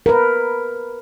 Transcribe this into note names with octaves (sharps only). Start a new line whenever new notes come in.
A#4 B4